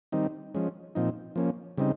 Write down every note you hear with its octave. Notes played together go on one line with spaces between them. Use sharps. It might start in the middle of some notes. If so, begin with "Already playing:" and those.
D#3 G3 C4 D#4
F3 G#3 C#4
A#2 F3 C4 D#4
F3 A#3 C#4
C#3 G3 C4 D#4